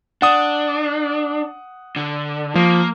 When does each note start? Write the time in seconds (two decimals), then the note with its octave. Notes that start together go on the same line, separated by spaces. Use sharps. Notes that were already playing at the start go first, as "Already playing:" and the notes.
0.22 D4 F#5 D#6
1.96 D3
2.55 F3 A#3